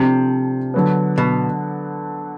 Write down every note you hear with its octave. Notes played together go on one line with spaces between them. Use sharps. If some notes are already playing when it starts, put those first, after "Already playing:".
Already playing: C3 F3 A3 D4
D3 F#3 B3
B2